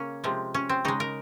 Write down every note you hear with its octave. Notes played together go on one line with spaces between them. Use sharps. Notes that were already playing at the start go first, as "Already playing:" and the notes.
Already playing: C#3 A#3 C#4
C3 F3 G#3
C#4
C4
C#3 G#3 D#4
A#4